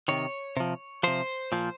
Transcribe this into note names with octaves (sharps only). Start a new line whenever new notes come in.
C3 D#3 C#5
C3 F3
C3 F3 C5
A#2 F3